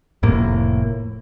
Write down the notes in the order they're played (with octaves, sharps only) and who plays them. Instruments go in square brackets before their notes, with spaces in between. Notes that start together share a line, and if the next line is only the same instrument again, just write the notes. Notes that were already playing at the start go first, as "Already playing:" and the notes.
[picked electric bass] F1 A2 A#3